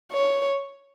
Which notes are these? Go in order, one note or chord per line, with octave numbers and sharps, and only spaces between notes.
C#5